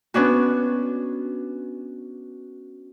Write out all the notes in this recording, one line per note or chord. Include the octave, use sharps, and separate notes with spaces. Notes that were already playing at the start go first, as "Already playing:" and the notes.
B3 C#4 D4 F#4